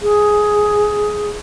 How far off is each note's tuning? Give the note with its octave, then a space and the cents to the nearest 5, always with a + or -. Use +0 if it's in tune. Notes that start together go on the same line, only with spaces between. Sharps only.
G#4 +10